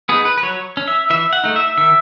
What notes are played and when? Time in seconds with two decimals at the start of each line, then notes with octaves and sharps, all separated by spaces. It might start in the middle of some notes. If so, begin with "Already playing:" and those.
0.09 B3 D#4 G#4
0.25 B4
0.38 B4
0.43 F#3 C#5
0.77 C#4
0.88 E5
1.10 E3 E5
1.33 F#5
1.44 A3 D#4
1.56 E5
1.78 D#3 E5